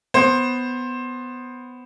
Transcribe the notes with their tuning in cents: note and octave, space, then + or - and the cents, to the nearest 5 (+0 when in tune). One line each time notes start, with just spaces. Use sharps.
B3 +10 C5 +15